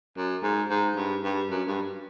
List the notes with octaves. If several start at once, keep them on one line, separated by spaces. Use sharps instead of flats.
F#2
G#2
G#2
G2
G2
F#2
G2